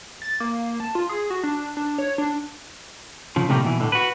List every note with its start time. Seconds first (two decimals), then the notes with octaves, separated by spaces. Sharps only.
0.22 A6
0.40 A#3
0.80 A5
0.95 F4
1.09 G#4
1.30 F#4
1.43 D4
1.77 D4
1.98 C#5
2.18 D4
3.36 C#3 F3
3.49 A2 C3 D#3 G3 A#3
3.64 B2 E3
3.80 A2 D3
3.92 F#4 B4